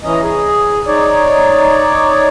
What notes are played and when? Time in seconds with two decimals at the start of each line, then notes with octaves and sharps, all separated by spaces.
0.04 E3 C#4 D#5 A#5
0.23 G#4
0.87 D#4 C#5 D5